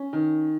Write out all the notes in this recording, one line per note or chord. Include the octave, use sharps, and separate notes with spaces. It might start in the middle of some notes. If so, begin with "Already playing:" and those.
Already playing: C#4
D#3